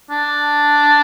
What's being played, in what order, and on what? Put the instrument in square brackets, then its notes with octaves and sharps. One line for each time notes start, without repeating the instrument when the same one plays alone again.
[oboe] D4